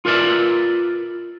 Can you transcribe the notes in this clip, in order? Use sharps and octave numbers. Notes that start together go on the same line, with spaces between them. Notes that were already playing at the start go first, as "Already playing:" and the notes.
F4 A#4 B4 D5 E5